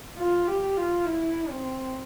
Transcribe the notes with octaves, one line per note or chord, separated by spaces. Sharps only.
F4
G4
F4
E4
C4